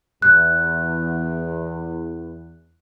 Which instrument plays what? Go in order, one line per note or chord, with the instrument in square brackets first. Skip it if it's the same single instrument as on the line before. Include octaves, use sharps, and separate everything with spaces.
[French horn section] E2 [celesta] F#6